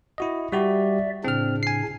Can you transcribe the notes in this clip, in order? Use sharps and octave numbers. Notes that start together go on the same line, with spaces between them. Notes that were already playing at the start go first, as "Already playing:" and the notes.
E4 F#4 D#5
G3 F#4 G4 D5 E5
A2 C#3 C4 D4 F6
G#5 C7